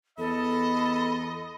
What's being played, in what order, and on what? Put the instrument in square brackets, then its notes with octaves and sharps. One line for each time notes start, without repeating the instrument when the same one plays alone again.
[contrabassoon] E2 [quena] A4 [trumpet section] D#5 [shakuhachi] B5